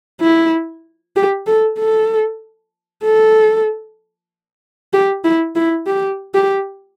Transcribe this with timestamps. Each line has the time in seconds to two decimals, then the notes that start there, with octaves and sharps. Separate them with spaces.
0.21 E4
1.16 G4
1.47 A4
1.79 A4
3.04 A4
4.93 G4
5.24 E4
5.56 E4
5.87 G4
6.34 G4